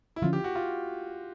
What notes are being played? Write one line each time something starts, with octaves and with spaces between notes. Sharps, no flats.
E4
D3 F3 A#3 C#4 F4
G4
F#4
F4